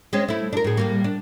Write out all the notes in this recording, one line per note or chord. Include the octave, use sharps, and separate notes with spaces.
G#3 C4 C#4
A3 E4
D4 A#4
A2 G#4
A2 G3 A#3
D4